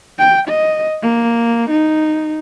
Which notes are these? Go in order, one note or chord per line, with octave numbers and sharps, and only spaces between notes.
G5
D#5
A#3
D#4